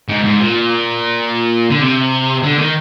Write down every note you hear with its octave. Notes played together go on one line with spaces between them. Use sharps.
G#2
G#2
A#2
D3
C3
D3
D#3